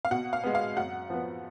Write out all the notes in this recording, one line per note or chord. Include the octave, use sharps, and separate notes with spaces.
F5
B2 F#5
F5
G#3 B3
F5
F#2 F#5
F3 B3